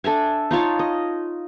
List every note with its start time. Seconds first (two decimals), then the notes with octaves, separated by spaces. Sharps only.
0.04 D4 A4 E5 G#5
0.51 D#4 F4 C#5 A5
0.79 D#5